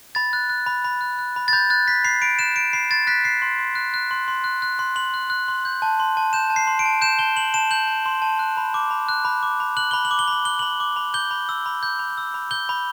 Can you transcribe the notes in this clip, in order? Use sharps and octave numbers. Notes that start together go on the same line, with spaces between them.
B5 A6
F#6
F#6
B5
B5
F#6
F#6
B5
A6
B5 G6
F#6 A6
F#6 B6
B5 C7
B5 D7
F#6 E7
F#6 D7
B5 C7
C6 A6
F#6 B6
F#6 C7
C6
C6
F#6
F#6
C6
C6
F#6
F#6
C6
C6 F#7
F#6
F#6
C6
G6
A5
C6
A5
G6 E7
A5
C7
C6
D7
A5
G6 E7
A5 G7
C6 F#7
A5 E7
G6 F#7
A5
C6
A5
F#6
B5
D6
B5
F#6
B5
D6
B5
F#6 F#7
B5 G7
F#7
D6
G7
B5 F#7
F#6 G7
B5 F#7
D6
B5
G6 G7
B5
E6
B5
G6
B5
E6
B5
G6 G7
B5